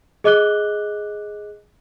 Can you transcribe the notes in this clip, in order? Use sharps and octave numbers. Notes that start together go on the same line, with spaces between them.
G#4 D#5 D6 F#6 G7